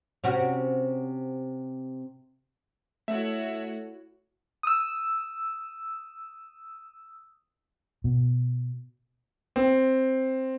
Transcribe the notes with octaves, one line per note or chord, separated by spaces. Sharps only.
C3 C#4 F#4
A3 E4 F#4 C#5 E5
D#6 E6
B2
C4